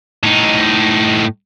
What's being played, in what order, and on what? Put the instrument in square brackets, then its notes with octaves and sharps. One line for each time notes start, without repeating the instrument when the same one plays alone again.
[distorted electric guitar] A2 D#4